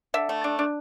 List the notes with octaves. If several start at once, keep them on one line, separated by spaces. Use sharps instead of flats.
D3 E5
A3
D4
D4